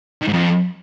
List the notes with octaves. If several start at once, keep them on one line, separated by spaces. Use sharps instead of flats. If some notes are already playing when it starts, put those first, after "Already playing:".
D#3
G#2
F2